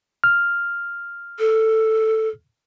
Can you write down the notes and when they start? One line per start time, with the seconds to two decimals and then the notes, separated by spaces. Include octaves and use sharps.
0.24 F6
1.39 A4